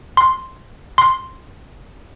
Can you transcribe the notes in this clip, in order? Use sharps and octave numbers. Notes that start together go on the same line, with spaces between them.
C6
C6